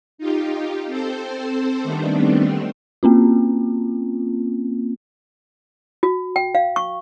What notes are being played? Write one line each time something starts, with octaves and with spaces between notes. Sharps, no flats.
D#4 F4 G4
C4 A4 C5
D#3 G3 A3 B3 C4 D4
A#3 C4 C#4 F4
F#4
G5
F5
C#6